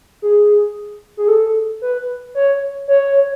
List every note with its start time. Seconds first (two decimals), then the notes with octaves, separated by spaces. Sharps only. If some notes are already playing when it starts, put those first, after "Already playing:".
0.22 G#4
1.17 G#4
1.28 A4
1.82 B4
2.35 C#5
2.88 C#5